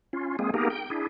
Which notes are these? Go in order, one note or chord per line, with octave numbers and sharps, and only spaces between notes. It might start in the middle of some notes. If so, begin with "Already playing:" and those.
C#4 F4
G#3 A#3 C4 G#4
A#3 B3 D#4 G4 G#4 A#4
G5
D4 E4 G#4